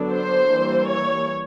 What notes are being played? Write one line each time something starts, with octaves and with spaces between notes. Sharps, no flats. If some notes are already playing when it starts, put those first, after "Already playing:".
Already playing: D3 F#3 B3 D4
C5
E3 G3 A#3
C#5